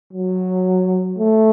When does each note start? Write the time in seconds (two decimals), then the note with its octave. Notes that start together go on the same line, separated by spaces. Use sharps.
0.13 F#3
1.18 A3